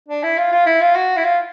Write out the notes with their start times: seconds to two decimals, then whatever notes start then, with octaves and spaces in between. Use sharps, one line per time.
0.08 D4
0.23 E4
0.37 F4
0.52 F4
0.66 E4
0.81 F4
0.95 F#4
1.17 E4
1.24 F4